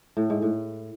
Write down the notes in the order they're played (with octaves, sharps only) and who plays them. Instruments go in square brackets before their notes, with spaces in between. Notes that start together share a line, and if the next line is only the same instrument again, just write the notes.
[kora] A2
G#2
A2